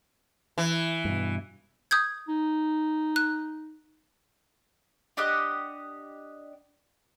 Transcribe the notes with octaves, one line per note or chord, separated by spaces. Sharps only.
E3
G2 B2
D#6 G6 G#6
D#4
F#6
D4 G4 D#5 F#5